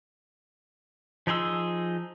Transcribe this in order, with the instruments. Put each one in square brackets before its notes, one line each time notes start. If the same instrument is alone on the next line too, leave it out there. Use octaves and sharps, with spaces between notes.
[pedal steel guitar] F3 D#4 G#4 C6 E6